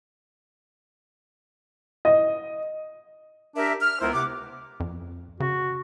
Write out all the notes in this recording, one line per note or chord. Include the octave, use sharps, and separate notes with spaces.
D#5
D4 G4 A#4 E5
F6
C#2 B3 E4 A#4 C5
C3 F#5 D6
F2
C#3 F#4